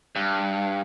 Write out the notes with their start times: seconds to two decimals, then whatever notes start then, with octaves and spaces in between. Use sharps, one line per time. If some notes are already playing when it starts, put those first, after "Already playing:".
0.16 G2